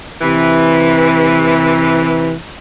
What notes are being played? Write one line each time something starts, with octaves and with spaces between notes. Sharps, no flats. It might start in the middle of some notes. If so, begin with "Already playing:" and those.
C3 E3